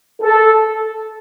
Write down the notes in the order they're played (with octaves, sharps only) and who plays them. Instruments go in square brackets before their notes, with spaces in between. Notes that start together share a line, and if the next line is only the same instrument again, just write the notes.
[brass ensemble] A4